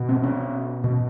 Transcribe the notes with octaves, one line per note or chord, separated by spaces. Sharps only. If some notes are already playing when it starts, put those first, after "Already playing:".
Already playing: B2
C4
C#4
B2